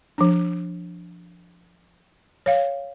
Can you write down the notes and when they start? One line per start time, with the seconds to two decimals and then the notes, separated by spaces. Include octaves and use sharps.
0.18 F3 D4
2.46 C#5 F5